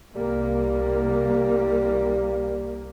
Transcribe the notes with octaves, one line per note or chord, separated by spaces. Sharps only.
C2 G3 A#3